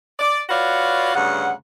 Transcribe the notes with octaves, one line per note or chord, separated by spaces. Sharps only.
D5
F4 F#4 B4 C#5 D5 F5
D2 G2 C#3 F#5